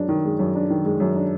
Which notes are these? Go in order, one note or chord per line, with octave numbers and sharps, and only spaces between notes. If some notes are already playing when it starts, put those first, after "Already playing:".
Already playing: F#2 G#3 D4
D#3
G#3
F#2
D4
D#3
G#3
F#2
D4